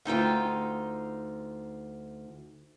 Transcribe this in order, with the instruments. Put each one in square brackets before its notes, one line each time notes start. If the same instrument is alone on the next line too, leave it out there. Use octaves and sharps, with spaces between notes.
[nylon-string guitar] D2 D#4 F4 G5